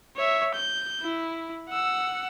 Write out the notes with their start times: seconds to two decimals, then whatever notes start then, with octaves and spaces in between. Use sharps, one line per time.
0.16 C#5 E5
0.54 G6
1.02 E4
1.69 F#5 E6